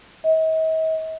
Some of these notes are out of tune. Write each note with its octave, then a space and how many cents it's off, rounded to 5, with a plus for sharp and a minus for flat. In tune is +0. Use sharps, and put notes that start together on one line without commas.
D#5 +45